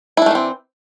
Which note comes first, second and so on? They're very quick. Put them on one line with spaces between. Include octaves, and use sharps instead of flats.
E4 D4 A3 E3 C4